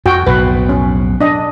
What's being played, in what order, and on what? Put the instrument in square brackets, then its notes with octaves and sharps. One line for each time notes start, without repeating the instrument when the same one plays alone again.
[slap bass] F2 [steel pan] F#4 G5
[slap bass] B1 F2 A2 [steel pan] B4
[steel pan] C#4
D4 D#5